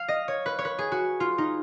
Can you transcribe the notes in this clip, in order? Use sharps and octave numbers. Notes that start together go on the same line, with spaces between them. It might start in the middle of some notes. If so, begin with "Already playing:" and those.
Already playing: F5
D#5
C#5
B4
C#5
B4
G#4
F#4
F4
D#4